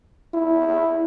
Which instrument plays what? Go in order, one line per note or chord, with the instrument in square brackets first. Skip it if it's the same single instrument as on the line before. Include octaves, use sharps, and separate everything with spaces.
[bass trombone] E4